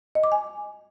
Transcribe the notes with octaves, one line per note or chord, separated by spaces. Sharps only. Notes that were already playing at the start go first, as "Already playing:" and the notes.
D#5
D6
G#5